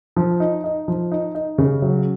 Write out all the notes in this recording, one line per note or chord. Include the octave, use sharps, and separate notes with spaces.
F3
D#4
D#4
F3
D#4
D#4
C#3
F#3